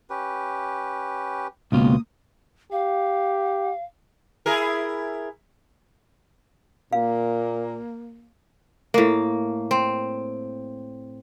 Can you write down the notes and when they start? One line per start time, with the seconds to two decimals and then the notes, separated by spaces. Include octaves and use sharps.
0.10 C#4 G4 B4
1.72 C#2 B2 A#3 F4 D#6
2.72 G4 F5
4.46 E4 G#4 A#4
6.93 A#2 A#3 F5
8.94 A2 A#3
9.71 C4